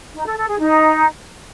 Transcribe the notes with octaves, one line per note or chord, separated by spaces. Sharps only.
D#4
A4
A4
G#4
D#4